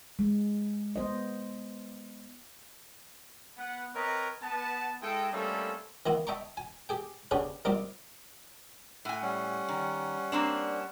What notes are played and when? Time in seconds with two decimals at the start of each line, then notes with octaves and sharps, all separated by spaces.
0.19 G#3
0.96 B3 C5 D#5
3.58 B3 F#5
3.95 C4 A#4 B4 C#5 D#5
4.42 B3 A5
5.02 G#3 E4 A4 D#5 G5
5.32 G3 A3 A#3 C4 C#4 A4
6.06 D#3 A#3 B3 E4
6.27 D#5 E5 G5 A5 A#5 C#6
6.57 G#5
6.89 G4 G#4 G5
7.31 C#3 B3 C#4 D4 G4 C#5
7.65 G3 A#3 C4 D#4 F4 D6
9.05 A2 F#5 G#5
9.22 G3 C#4 F#5
9.69 D#3
10.32 A#3 C4 D4